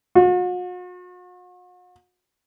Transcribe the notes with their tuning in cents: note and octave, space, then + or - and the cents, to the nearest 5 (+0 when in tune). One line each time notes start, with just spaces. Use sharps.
F#4 -45